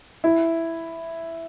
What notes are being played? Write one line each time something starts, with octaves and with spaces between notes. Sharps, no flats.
E4